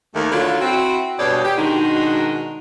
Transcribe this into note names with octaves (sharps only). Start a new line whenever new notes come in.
D#2 A3
D3 F#3 E4 F4
C4 E4 F#4
G2 B2 G4 G#4 C#5 D5
G4
B2 D#3 G#3 D4 D#4 F#4